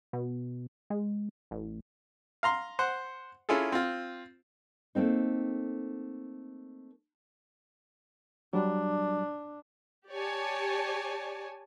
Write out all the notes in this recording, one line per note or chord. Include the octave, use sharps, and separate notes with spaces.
B2
G#3
A1
F5 A#5 C6
C5 F#5
C#4 E4 F4 G#4 A4
C4 F4
A3 A#3 C4 D#4
F#3 G3 D4
G4 C#5 D5 G#5 A5